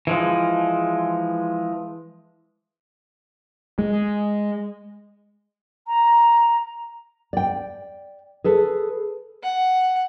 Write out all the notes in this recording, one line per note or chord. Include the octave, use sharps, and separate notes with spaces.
E3 F3 G#3
G#3
A#5
D5 G5
G#4 A4 B4
F#5